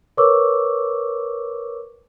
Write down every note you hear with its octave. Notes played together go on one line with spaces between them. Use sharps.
A#4 B4 C#5 C#6 D6 E6